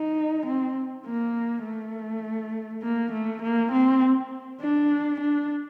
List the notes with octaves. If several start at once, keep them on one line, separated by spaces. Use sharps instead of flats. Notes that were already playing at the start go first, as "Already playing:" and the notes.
Already playing: D#4
C4
A#3
A3
A#3
A3
A#3
C4
D4
D4